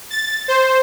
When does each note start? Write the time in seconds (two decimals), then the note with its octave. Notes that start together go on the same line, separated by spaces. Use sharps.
0.10 A6
0.48 C5